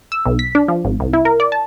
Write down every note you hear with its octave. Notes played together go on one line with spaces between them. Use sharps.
E6
B1
B6
D4
F3
G#1
C2
E4
A#4
D5
A5